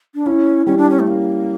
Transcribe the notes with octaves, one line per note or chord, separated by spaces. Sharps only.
D4
C#4 E4
G3 C#4
D4
C#4
A3
A#3 C#4